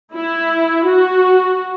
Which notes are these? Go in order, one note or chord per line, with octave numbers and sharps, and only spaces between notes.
E4
F#4